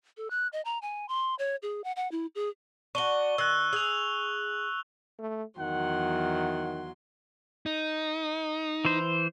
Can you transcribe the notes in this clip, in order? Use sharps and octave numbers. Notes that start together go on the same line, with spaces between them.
A4
F#6
D#5
A#5
G#5
C6
C#5
G#4
F#5
F#5
E4
G#4
D4 F#4 C#6 G7
D#3 E6 F#6
G#4 E6 F7
A3
E2 D#3 F#3 F#5 C6
D#4
E3 C5